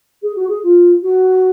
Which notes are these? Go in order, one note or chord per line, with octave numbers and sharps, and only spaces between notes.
G#4
F#4
G#4
F4
F#4